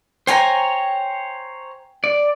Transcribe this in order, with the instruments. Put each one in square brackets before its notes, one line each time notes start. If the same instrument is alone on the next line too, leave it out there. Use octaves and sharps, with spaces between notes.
[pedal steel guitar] C5 C#5 A#5 [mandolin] G5 G#5 C6
[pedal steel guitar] D5